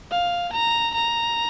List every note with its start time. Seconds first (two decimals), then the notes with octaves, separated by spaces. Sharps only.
0.11 F5
0.53 A#5
0.94 A#5